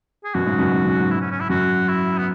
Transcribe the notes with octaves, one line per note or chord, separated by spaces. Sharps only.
G#4
F#2 B2 F#4
G#2 C#3
F#2 B2
G#2
F#2
G#2
E4
C#4
C#4
E4
F#2 F#4
E4
B3